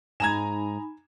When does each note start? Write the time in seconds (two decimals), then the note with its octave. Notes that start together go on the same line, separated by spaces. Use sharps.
0.20 G#2 D#4 G#5 A#5 B5 G#6 E7